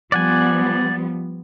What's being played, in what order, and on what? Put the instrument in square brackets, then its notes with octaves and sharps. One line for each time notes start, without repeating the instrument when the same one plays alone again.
[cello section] F3 G3 B3 [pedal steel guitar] D5 F#5 G#5